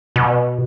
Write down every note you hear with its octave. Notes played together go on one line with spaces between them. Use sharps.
B2